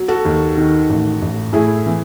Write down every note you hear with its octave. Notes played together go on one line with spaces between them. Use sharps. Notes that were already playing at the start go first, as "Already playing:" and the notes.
Already playing: F#3
F#4 A4
D#2
D#3
A1
A1
A2 E4 G#4
E3